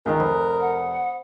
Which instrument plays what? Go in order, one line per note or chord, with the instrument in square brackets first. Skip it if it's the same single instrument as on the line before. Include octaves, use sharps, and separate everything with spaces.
[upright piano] C#2 D#3 [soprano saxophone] A#4 [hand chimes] G#5 D#6 F#6
[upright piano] F1 [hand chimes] C5 B5 D#6
[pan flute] F#5